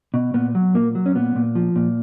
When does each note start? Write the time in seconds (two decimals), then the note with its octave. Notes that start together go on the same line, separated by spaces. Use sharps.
0.14 B2
0.34 A#2 B3
0.55 F#3
0.74 A#2 A#3
0.95 F#3
1.06 C#4
1.15 A#2 B3
1.36 A#2
1.55 F3
1.76 A#2